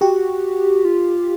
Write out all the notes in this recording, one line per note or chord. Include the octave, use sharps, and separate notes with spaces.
F#4 G4
F4